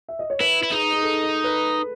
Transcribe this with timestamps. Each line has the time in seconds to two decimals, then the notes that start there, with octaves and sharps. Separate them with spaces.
0.09 E5
0.19 D#5
0.30 C#5
0.40 E4 B4
0.63 E4
0.71 D#4 G#4
0.93 G#4
1.03 A4
1.23 A4
1.44 B4